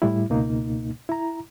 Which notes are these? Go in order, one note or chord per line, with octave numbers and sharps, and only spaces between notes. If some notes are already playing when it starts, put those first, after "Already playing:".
A2 G3 E4
C#2 B2 A#3 D#4
E4 A#5